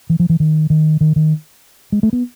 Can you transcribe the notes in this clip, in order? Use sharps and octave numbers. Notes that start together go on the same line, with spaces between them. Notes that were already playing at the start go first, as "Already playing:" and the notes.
E3
F3
E3
D#3
D#3
D#3
D#3
G#3
A3
B3